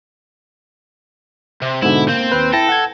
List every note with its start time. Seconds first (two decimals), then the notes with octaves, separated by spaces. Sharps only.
1.62 C3
1.82 G#2 B2 D3 E4
2.08 A#3 C4 C5
2.32 D#2 B4
2.53 E4 A4 G5 A#6
2.69 F#5 G#6